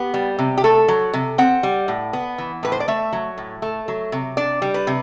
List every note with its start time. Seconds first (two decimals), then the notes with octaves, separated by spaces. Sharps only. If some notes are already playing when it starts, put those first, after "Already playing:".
Already playing: B3 G4
0.14 G3
0.39 C3
0.57 G4
0.64 A3 A4
0.88 F#3
1.13 C3
1.38 C4 F#5
1.63 G3
1.88 A2
2.13 B3
2.38 E3
2.63 A2 B4
2.72 C5
2.80 D5
2.88 A3 E5
3.13 F#3
3.38 A2
3.62 A3
3.88 F#3
4.12 C3
4.37 D4 D5
4.62 G3
4.74 B4
4.87 C3